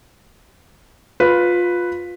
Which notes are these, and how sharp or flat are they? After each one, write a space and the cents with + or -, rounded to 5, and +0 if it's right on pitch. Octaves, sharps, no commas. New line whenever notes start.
F4 +15 B4 +0